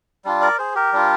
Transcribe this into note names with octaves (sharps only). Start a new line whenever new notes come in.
G3 D4 F4
A#4 D5
G#4 C5
G4 A#4
G3 D4 F4